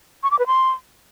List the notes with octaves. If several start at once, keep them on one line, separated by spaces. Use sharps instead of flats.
C#6
D6
B4
C6